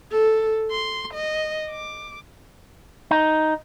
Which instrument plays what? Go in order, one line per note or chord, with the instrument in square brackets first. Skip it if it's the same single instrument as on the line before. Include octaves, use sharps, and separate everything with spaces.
[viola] A4
C6
D#5
D6
[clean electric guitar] D#4